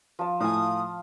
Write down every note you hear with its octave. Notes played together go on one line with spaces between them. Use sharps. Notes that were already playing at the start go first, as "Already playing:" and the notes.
F3 A5
A2 F5 G#5 D#6